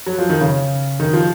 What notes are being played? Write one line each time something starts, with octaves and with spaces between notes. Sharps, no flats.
F#3
F3
D#3
C#3
D#3
F3